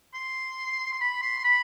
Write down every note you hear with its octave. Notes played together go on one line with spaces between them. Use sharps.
C6
C6
B5
C6
C6
B5